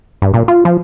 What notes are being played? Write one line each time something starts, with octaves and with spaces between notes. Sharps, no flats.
G2
A#2
F4
F3